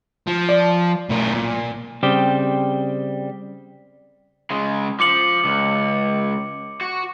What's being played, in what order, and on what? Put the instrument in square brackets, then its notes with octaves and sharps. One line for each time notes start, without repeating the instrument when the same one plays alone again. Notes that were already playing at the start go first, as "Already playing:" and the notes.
[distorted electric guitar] F3
[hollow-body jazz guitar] D5
[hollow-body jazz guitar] B1 [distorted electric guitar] A2 A#4
[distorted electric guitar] A#2
[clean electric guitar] C#3 G3 C4 G4
[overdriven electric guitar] C#3 G#3
[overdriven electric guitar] F3 [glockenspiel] D6 C#7 F#7
[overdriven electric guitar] C#2
F#4